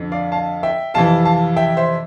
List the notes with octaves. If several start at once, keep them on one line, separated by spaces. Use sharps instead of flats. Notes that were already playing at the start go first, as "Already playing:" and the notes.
Already playing: F2 D3
D5 F5
F5 A5
E5 G5
F2 C3 E3 F5 A5
F5 A5
E5 G5
C5 E5